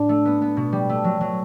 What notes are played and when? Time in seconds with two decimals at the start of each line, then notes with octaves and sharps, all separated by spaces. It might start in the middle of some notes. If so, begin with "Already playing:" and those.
Already playing: A2 D4
0.09 A3
0.25 B3
0.42 B3
0.57 B2
0.72 G3
0.89 A3
1.04 F#3
1.21 F#3